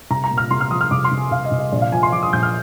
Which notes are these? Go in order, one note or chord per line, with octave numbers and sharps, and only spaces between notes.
C2 A#5
A#5
A#2
F6
C2 C6
F6
F3 D#6
F6
C2 D6
C6
C2
G#5
C2 F5
D#5
C2
D#5
A#1 D5
F5
F3 G#5
C6
F3 D6
D#6
A#1 G6
F6